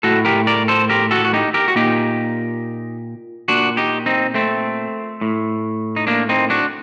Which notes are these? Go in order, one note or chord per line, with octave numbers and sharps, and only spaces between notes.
A2 F#4 A4
G4 A#4
A#4 D5
A4 C5
G4 A#4
F#4 A4
F#4
D#4 G4
G4 A#4
F#4
A#2 D#4 G4
A#2 D4 F#4
D#4 G4
C4 D#4
A3 C4
A2
D#4
A#3 D4
C4 D#4
D4 F#4